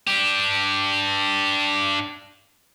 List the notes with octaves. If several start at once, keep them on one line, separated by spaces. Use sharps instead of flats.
D4 G4